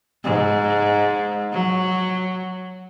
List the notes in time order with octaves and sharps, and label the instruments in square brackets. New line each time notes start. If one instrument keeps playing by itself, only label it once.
[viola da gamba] G#2
F#3